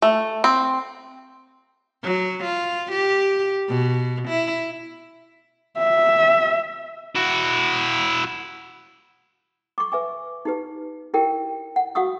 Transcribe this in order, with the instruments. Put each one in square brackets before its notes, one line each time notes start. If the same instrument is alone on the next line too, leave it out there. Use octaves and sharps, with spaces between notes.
[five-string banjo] A3
C4
[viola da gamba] F#3
F4
G4
B2
E4
[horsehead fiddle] E5
[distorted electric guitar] E4 F#4
[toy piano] C#6 D6
B4 E5 G#5 D6
D#4 G4 B4
E4 G4 A#4 G5
F#5
F#4 F5 F#5 C#6 D#6 E6